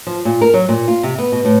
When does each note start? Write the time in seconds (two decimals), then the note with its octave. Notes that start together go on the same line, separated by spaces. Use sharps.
0.07 F3
0.25 A#2
0.41 A#4
0.54 F#3
0.69 A#2
0.88 F4
1.03 C3
1.18 B3
1.32 B2
1.45 A2